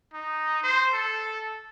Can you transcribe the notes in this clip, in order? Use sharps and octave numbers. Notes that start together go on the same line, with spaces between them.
D#4
C5
A4